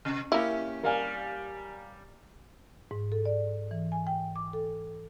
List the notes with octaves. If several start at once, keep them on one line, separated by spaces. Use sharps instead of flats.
C3
A#3 C#4 E4 G4
G3 A#4 F5 G#5
G#2
A4
D5
E3
G#5
G5
D6
A4